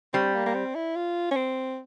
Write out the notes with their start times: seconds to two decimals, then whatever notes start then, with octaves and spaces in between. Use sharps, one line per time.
0.13 G3 C4
0.35 A#3
0.46 A#3
0.55 C4
0.75 E4
0.96 F4
1.31 C#4
1.36 C4